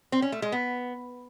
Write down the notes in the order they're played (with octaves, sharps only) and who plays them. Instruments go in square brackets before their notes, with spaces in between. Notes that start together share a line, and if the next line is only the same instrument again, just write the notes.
[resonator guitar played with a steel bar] C4
C#4
A3
G#3
B3